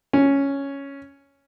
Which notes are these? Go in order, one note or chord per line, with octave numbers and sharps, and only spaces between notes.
C#4